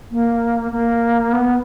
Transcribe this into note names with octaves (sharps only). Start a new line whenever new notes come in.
A#3
A#3
B3